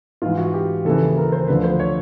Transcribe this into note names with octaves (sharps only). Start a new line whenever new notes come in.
G#2 E3 F4
F#4
G4
D#2 C#3 E3 A4
A#4
C5
D2 D3 F3 B4
C5
C#5